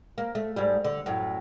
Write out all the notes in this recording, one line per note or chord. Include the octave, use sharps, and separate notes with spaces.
A#3
A3
G#2 G3
D3
F#2 A2